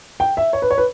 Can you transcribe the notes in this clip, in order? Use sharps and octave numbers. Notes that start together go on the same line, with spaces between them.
G5
E5
C#5
B4
C#5
B4